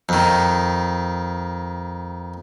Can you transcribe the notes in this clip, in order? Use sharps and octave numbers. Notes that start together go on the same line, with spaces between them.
F2 D#3